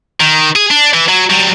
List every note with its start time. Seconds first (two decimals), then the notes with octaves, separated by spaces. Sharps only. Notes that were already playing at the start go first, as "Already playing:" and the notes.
0.21 D#3
0.56 G#4
0.71 D4
0.94 E3
1.09 F#3
1.31 F#3 G3